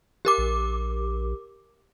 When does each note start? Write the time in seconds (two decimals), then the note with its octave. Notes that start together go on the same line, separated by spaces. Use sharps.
0.25 G4 A#4 D6
0.38 A#1